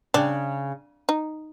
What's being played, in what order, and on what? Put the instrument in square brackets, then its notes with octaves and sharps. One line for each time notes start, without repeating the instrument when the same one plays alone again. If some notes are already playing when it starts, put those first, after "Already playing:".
[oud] C#3 [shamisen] D4
[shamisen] D#4